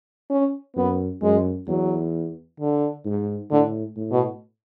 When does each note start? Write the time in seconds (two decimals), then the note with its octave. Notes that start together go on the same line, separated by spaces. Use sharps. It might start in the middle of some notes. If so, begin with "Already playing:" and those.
0.30 C#4
0.76 F#2 B3
1.22 F#2 G#3
1.68 E2 F#3
2.60 D3
3.06 G#2
3.51 A2 D3
3.97 A2
4.12 B2